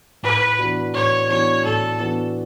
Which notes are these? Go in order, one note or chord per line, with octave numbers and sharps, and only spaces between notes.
A2 B4
E3 B3 D4 F#4
A2 C#5
E3 B3 D4 F#4 C#5
A2 A4
E3 B3 D4 F#4